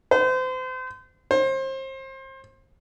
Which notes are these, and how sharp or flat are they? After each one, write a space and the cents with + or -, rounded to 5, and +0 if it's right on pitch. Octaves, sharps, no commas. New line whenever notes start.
C5 -35
C5 +30